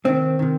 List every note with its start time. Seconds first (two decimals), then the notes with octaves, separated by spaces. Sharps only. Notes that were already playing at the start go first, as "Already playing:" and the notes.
0.05 C3 D#3 C4
0.39 C3 D#3